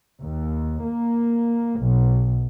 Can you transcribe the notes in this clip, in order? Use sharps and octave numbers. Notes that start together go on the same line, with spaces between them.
D#2
A#3
B1